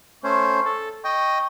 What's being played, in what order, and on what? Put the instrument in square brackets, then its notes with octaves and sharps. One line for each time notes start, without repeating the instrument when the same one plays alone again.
[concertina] A3 C#4 C5 [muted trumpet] C#6
[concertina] A4
[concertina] D#5 G5 [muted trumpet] C#6